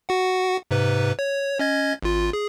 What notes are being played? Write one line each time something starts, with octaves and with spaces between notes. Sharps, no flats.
F#4 F#5
G#2 C3 B4
C#5
C#4 D#5 G#6
G#1 F4
G#4